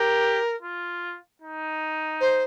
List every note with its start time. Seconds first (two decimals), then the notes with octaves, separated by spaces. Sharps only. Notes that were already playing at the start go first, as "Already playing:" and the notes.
Already playing: G4 A#4
0.63 F4
1.42 D#4
2.20 C5